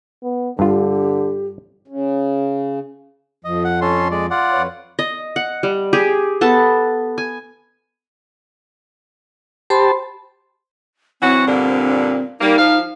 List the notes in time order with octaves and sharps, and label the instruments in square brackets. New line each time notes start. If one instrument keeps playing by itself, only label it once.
[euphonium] B3
[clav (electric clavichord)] G2 F4 [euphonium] D3 [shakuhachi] G4
[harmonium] C#3
[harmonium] F2 F3 [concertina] D#5
[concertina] F#5
C#4 A4 C6
G#3 D5
F4 D5 F#5
[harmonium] F2 B4 C#5
[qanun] D#5
F#5
G3
G4 G#4
B3 A4 A5
G#5
[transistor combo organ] G4 A5 [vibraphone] C5 B5 C6
[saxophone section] E3 F#3 F#4 [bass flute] C4
[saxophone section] G2 A#2 D3
[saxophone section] G3 A#3 [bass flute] D#4
[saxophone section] F3 F5